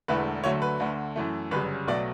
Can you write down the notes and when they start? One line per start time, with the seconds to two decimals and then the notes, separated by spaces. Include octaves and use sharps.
0.08 E1 E2 D3 A3 B4
0.44 D2 D3 F#3 A3 C#5
0.62 B4
0.80 D2 D3 A3
1.16 F#2 E3 A3
1.51 G1 F#2 C#3 G3 B4
1.87 B1 B2 F#3 A3 D5